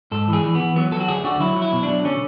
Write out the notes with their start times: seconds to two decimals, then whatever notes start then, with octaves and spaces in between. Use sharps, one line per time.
0.12 G#2 A4
0.28 E3
0.33 G#4
0.44 E3
0.55 E3 B3
0.76 F#3 B3
0.92 F#3 A4
1.00 F#4
1.08 D2 G#4
1.24 D3 F#4
1.40 F#3 E4
1.56 F#3
1.62 E4
1.73 B2
1.83 D4
1.88 F#3
2.05 D3 C#4